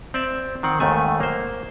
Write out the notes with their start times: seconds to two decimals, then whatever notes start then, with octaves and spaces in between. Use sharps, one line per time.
0.14 C4 D5 E5
0.63 D#3 C4 F#5
0.80 D#2 G#2 D#3 A3 G#5
1.20 A#3 C5